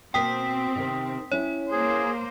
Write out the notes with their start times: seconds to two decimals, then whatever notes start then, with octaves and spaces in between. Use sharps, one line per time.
0.14 B2 A#3 C4 G5 D#6 B6
0.75 C3 D#3
1.32 C#4 E4 C#5
1.71 A#3 G#4 C5